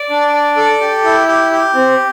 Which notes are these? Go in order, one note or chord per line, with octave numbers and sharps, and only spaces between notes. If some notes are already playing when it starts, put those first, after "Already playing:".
Already playing: D5
D4
D5
A4
G4
E4
G4
G4
C4